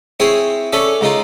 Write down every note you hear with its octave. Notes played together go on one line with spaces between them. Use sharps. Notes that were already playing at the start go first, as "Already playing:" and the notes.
C4 E4 G#4 C5 C#5
C#4 D4 A4 E5
C#2 G#3 D#4 F4